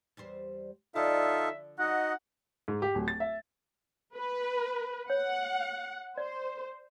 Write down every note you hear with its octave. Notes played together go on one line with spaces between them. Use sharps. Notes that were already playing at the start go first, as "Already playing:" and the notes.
E2 G3 C5
D3 F3 D#4 F4 A4 D5 E5
D#4 F#4 D#5 F#5
G#2
G4
D1
A6
E5
B4
C#5 F#5
C5 D5